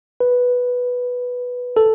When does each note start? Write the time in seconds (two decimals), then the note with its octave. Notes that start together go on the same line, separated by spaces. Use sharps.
0.20 B4
1.77 A4